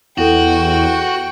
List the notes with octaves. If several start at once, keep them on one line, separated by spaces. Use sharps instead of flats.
E2 E4 F#4 A4 G5